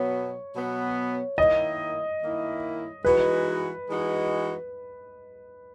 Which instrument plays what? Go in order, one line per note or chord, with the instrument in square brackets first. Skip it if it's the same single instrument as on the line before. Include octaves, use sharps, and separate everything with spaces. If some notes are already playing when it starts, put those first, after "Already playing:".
Already playing: [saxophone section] B2 F#3 B3 [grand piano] C#5
[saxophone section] B2 F#3 B3
[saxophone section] D#3 A#3 E4 [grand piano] D#5
[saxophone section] D#3 A#3 E4
[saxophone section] E3 G#3 D#4 F#4 [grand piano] B4
[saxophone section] E3 G#3 D#4 F#4